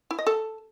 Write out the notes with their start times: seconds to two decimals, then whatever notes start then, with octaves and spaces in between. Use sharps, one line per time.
0.11 E4
0.19 D#5
0.27 A4